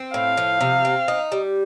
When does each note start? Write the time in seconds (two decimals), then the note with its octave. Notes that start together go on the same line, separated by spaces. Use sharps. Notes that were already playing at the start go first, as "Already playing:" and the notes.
Already playing: C4
0.14 A2 F5
0.37 F3
0.61 C3
0.85 C4
1.08 D#4
1.32 G3